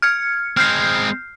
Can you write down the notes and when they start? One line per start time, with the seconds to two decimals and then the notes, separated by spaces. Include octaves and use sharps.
0.02 F6 G#6 C#7
0.57 G#3 C4 F6 G6 C7